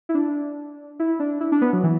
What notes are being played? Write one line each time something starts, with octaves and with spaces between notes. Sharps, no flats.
E4
D4
E4
D4
E4
D4
B3
F#3
E3